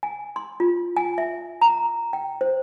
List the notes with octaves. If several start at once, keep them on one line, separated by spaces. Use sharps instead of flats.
G#5
C6
F4
G#5
E5
A#5
G5
C5